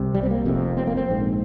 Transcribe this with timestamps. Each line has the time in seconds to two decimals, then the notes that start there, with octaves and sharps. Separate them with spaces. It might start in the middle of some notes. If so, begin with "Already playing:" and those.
Already playing: C2 C3
0.14 G3
0.23 C4
0.31 A#3
0.45 F1 F2 C3
0.77 C4
0.87 A#3
0.97 C4
1.08 A#1 G#2